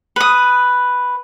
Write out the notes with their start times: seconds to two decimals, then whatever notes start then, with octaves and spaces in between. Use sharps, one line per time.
0.16 B4 D#6